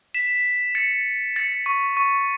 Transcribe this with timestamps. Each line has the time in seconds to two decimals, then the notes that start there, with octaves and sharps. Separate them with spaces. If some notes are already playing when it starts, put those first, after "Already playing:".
0.14 B6 E7
0.75 A6 C#7
1.36 A6 C#7
1.66 C#6
1.97 C#6